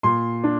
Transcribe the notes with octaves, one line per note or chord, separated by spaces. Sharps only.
A#2 C6
D4